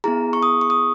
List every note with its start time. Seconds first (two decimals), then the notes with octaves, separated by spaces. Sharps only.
0.04 B3 E4 G#4 A#5
0.33 C#6
0.43 D#6
0.61 C#6
0.70 D#6